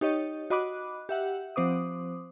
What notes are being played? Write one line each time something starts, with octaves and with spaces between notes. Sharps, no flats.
D#4 G4 C#5 D#5
F#4 D#5 B5 D6 F#6
G4 E5 F#5
F3 C4 C5 D6 D#6